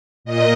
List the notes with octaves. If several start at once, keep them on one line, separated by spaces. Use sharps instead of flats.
A#2 D#5